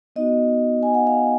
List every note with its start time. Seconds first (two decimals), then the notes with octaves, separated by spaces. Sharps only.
0.16 B3 D#4 F#4 D#5
0.83 G#5
0.94 F#5
1.07 F5